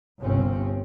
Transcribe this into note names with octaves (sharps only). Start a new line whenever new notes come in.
G1 C2 C4 C#4